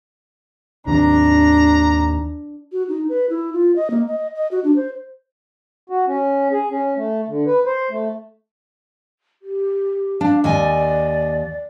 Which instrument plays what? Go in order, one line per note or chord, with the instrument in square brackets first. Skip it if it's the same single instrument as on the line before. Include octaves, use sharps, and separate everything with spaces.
[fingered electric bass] D#2 D#3 C4 [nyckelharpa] D4 [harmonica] A#5
[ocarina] F#4
D#4
B4
E4
F4
D#5
A#3
D#5
D#5
F#4
D4
C5
[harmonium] F#4
C#4
G#4
C#4
A3
D3
B4
C5
A3
[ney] G4
[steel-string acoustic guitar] D4 [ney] F5
[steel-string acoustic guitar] D#2 D#5 G#5 [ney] D5